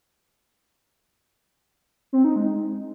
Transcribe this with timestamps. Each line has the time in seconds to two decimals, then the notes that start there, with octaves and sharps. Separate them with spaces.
2.13 C4
2.24 D#4
2.36 G#3